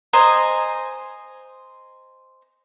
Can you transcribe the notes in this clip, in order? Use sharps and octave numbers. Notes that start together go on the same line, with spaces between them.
C5 D#5 G#5 A#5